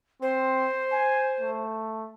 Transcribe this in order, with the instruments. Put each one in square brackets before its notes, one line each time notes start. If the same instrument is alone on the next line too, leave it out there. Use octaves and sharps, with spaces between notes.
[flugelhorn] C4 [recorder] C5
[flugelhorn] G#5
A3